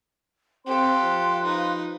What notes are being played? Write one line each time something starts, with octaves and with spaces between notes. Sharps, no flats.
C4 G4 A4 F5 C6 F#6
F3
D#4 B4